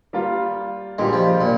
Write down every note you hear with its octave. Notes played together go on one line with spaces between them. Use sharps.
G3 A#3 F4
A#2 G3 G#3 D4 G4
F3
A#2